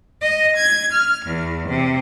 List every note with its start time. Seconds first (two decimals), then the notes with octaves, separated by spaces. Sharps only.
0.20 D#5
0.55 G#6
0.91 F6
1.24 E2
1.67 C3